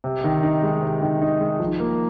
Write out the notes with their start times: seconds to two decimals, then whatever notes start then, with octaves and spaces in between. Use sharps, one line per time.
0.04 C3
0.24 D#3
0.43 D#4
0.62 G#3
0.82 C3
1.02 D#3
1.22 D#4
1.40 G#3
1.59 F3
1.80 A#3